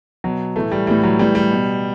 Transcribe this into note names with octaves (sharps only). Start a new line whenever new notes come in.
B2 F#3
A2 E3 A3
G3
A2 E3 G3
F#3
A2 E3 G3
G3
B2